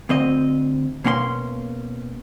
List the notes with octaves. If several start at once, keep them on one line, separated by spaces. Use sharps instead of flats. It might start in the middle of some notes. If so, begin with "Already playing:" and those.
D2 C4 D#5
B2 A#3 C#4 F#5 C6